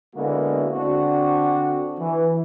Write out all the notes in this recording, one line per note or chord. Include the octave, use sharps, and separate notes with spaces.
D3 G#3 A#3 B3 E4 F#4
D3 C4 D4 F#4
E3